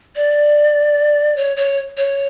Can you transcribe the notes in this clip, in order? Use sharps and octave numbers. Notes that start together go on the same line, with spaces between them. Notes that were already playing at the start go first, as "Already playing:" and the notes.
D5
C#5
C#5
C#5